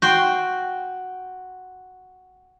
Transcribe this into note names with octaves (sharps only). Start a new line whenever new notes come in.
F#4 G5 C6